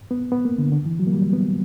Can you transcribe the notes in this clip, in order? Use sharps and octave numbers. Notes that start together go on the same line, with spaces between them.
B3
B3
A#3
D3
D3
E3
F#3
A#3
G3
B3